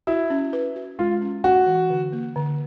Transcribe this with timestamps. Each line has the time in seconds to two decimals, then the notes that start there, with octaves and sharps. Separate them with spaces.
0.07 E4 F#4
0.30 C#4
0.53 B4
0.76 F#4
0.99 G#3 F4
1.21 C#4
1.44 C#4 F#4
1.67 E3
1.90 D3
2.13 A#3
2.36 D3